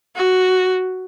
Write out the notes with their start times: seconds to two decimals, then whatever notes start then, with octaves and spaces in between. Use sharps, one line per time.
0.16 F#4